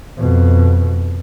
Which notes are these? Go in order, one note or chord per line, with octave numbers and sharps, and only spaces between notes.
F2 B2